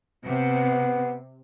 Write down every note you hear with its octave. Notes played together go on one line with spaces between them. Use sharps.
C3 B3